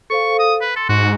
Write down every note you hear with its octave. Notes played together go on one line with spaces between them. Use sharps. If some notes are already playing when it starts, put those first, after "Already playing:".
A4 C5 F5 C#6
D#6
B4
A4 C6
G#2 F#4